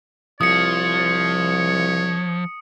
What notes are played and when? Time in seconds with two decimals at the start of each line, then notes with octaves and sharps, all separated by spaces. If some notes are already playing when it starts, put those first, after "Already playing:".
0.41 C2 F3 C#5 D#6 C#7